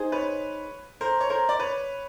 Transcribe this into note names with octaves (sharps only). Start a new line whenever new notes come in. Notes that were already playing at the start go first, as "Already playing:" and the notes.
Already playing: D#4 G#4 C5
B4 C#5
A#4 C5
C#5
A#4 C5
D5
B4 C#5